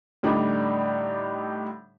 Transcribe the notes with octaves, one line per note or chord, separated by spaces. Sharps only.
A2 D3 G3 D4 D#4